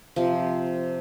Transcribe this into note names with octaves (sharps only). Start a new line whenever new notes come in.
C3 F3